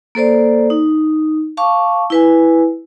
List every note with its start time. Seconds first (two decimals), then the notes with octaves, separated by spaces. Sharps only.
0.15 A#3 A4 C5 D5
0.70 D#4
1.57 F5 A5 C#6 D6
2.10 E4 B4 G#5